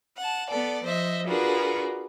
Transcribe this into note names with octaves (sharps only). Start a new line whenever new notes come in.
F#5 A5
B3 A4 D5
F3 C5 D#5 E5
D4 F4 F#4 G#4 A#4 B4